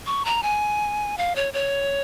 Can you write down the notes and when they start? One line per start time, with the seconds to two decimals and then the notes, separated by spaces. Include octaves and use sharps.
0.06 C#6
0.25 A#5
0.43 G#5
1.18 F5
1.36 C#5
1.54 C#5